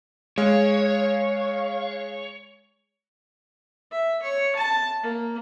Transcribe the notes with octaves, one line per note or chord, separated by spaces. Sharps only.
G#3 C#5 F5
E5
C#5
A5
A#3